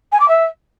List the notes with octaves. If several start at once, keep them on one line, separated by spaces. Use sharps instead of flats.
G#5
D6
E5